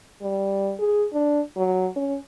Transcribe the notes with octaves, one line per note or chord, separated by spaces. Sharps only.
G3
G#4
D4
F#3
C#4